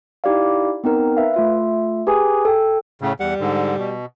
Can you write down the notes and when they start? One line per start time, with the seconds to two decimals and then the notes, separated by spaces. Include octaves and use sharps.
0.24 D#4 E4 G4 D5 F5
0.84 B3 C4 D#4 A#4
1.17 B4 E5 F5
1.34 A3 F4 E5
2.07 G4 G#4 B4 G#5 D#6
2.45 A4 G5
3.01 A2 C#3
3.20 E2 G3 F#5
3.40 G#2 D3
3.78 B2